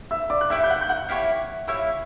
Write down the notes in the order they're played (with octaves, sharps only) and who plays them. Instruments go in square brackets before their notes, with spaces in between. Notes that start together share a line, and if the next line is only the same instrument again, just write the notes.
[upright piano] E5 E6
D5 D6
F#6
[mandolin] A#3 E4 G4 C#5 [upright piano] E5 E6
[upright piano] G6
F#5 F#6
G6
F#5 F#6
[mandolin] A#3 E4 G4 C#5
[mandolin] A#3 E4 G4 C#5 [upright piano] E5 E6